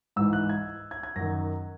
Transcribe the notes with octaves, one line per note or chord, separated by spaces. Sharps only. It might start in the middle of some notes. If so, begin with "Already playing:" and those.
G#2 E3 E6
F#6
G#6
G#6
G#6
F#2 D#3 A#6